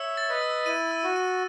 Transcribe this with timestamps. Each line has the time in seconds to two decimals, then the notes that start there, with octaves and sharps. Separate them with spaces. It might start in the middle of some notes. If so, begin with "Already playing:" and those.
Already playing: C#5 E5 E6
0.17 A6
0.29 B4 D#5
0.41 E6
0.66 E4 D#7
0.91 E6
1.04 F#4
1.16 D#7